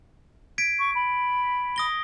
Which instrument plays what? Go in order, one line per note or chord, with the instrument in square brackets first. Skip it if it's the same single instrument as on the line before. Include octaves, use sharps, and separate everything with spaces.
[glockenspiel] G#6 B6 D7
[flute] C#6
B5
[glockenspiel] D#6 A#6 G7